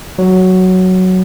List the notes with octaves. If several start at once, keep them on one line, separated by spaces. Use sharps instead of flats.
F#3